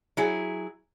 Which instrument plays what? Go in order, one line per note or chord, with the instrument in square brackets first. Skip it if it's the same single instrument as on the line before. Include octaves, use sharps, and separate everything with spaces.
[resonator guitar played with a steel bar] F#3 E4 G#4